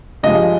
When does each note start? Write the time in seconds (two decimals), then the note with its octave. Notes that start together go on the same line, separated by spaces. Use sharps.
0.23 G2 F3 G#3 D#5